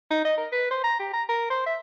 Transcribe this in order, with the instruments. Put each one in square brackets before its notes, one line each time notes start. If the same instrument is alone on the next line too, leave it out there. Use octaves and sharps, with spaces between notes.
[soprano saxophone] D#4
D#5
A#4
B4
C5
A#5
G4
A#5
A#4
C5
E5